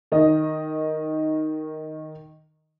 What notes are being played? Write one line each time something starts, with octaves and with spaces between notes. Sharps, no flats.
D#3 D#5